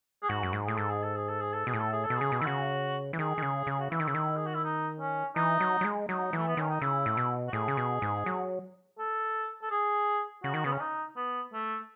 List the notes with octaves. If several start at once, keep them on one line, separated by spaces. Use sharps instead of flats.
G#4
G#2 F#4
F#2
G#2
A2 G#4
G#2 A4
G#4
A4
G#4
A4
G#4
A4
B2 G#4
A2
A4
G#4
A4
B2
C#3 G#4
B2
D#3 E4
C#3 F#4
E3
D#3 G#4
D#3
C#3
C#3 G#4
F#4
E3 E4
D#3
C#3
D#3
G#4
F#4
E4
D#4
C#4
E3 D#4
F#3
F#3
G#3
F#3 D#4
E3 A3
B3
D#3 C#4
D#4
C#3 E4
A2
B2
F#4
A2 G#4
C#3
B2
G#2
F#3
A4
A4
G#4
C#3 F#4
D#3
C#3 B3
C#4
D#4
B3
A3